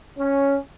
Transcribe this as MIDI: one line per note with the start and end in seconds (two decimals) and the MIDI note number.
0.18 0.56 61